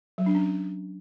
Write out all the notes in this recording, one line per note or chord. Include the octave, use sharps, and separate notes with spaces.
F#3
D4
C#4